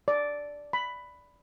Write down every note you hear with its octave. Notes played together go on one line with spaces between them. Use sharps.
D5
B5